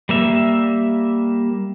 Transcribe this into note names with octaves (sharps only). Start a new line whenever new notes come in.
G3 A#3 E5